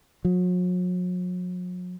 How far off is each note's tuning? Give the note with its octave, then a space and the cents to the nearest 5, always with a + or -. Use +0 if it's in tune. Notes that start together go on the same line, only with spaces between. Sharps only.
F#3 -45